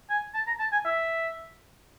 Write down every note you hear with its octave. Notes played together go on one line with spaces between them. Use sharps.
G#5
A5
A#5
A5
G#5
E5